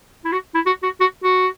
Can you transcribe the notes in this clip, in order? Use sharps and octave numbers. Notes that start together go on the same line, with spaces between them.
E4
F#4
E4
F#4
F#4
F#4
F#4